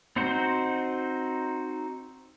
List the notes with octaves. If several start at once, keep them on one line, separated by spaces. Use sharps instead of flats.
C4 D#4 F#4 C5